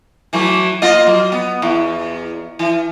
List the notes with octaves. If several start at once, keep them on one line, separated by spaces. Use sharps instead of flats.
E3 F#3 A3
A#3 F4 D#5
F#3
B3
E2
E3